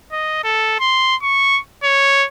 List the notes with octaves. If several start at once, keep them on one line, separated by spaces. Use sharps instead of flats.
D#5
A4
C6
C#6
C#5